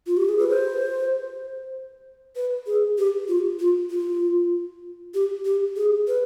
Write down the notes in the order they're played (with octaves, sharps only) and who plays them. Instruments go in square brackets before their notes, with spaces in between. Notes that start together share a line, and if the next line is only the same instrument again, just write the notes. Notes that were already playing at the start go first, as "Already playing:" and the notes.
[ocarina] F4
G4
G#4
B4
C5
B4
G#4
G4
F4
F4
F4
G4
G4
G#4
B4